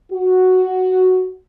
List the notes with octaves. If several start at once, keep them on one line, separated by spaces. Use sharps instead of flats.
F#4